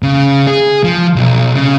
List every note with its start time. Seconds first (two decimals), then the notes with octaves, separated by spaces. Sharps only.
0.03 C#3
0.47 G#4
0.84 F3
1.16 B1
1.56 C#3